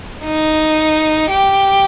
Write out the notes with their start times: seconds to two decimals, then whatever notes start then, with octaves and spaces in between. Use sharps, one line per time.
0.23 D#4
1.30 G4